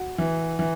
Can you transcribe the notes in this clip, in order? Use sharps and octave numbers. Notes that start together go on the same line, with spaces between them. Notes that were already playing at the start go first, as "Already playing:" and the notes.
Already playing: F#4
E3
E3